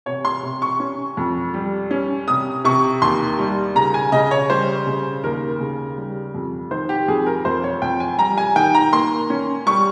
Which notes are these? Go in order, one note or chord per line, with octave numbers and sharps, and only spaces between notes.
C3 C#5
C6
C3
C#6
C#4
F2
G3
C#4
C3 D#6
C3 C#6
D#2 C6
G3
C#3 A#5
G#5
C#3 D#5
C#5
G3 C5
C#3
D#2 A#4
C#3
G3
F2
D#3 C5
G4
F2 G#4
A#4
F2 C5
C#5
F2 G5
G#5
G3 A#5
G#5
D#3 G5
A#5
A#3 C6
C#4
G3 C#6